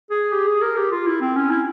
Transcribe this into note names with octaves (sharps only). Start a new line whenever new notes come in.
G#4
G4
G#4
A#4
G4
F4
E4
C4
C#4
E4